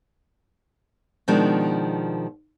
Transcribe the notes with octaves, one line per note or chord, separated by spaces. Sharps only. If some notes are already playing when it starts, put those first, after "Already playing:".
B2 D#3 F3 G#3 D4